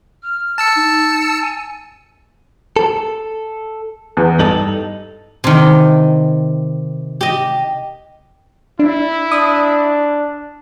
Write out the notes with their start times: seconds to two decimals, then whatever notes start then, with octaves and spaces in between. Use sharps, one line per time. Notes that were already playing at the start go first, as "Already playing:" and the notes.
0.22 F6
0.58 A5 E6 C#7
0.75 D#4
1.41 G#5
2.76 A4
4.17 E2
4.39 G2 D#4 A4 F#7
5.44 C3 D#3
7.21 G4 D#5
8.79 D4 E4
9.32 D4 D#6